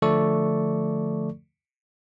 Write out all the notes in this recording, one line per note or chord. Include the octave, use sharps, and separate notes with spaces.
D3 F3 A3 A4 D5 C#6